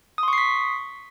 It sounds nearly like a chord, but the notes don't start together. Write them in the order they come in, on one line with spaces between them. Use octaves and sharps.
D#6 C6 C#6 C7 B6